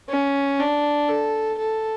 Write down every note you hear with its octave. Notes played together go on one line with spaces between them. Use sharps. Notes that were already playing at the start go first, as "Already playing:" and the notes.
C#4
D4
A4
A4